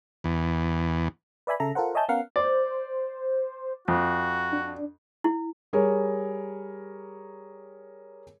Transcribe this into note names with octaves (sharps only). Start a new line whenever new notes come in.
E2
B4 D5 E5 G#5 B5
C#3 A4 E5 A#5
F4 A4 A#4 C5 F#5
C#5 D#5 E5 G#5 A5 G6
B3 C#4 A#4 F5 F#5
C5 D5
F2 F#4
D4
E4
G3 G#4 A#4 C#5